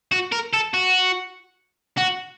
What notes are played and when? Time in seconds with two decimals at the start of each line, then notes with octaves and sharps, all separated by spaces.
0.12 F#4
0.32 A#4
0.53 A4
0.74 F#4
1.97 F#4